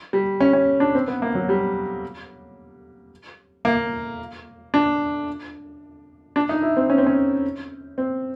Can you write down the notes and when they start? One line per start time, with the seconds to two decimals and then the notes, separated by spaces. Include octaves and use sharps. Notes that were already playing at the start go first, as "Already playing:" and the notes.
0.13 G3
0.40 C#4
0.53 C#4
0.80 D4
0.95 C4
1.08 B3
1.22 A#3
1.35 F#3
1.49 G3
3.65 A#3
4.74 D4
6.36 D4
6.49 D#4
6.62 E4
6.77 C4
6.90 C#4
6.98 C4
7.07 C#4
7.98 C4